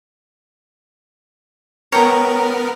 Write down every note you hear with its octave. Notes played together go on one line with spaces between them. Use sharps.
B3 A#4 C#5 G5 A#5